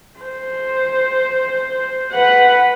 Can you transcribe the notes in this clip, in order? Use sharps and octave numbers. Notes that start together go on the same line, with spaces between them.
C5
B4 F#5